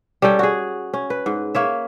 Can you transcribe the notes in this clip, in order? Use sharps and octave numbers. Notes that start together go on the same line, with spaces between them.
G3 C#4 A4 G5
F#4 G#4
C#4
B4
G#2
A#3 C#5 E5